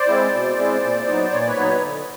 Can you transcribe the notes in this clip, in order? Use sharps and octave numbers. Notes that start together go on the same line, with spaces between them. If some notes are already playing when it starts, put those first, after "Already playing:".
Already playing: C5 D5
G#3 C4 E4
B2
G#3 C4 E4
A#2
F#3 B3 D#4
A#2 C#5
D5
B4 C#5
F#3 B3 D#4
D3